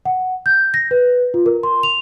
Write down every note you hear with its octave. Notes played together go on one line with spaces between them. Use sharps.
F#5
G6
A#6
B4
F4
A#4
C6
F7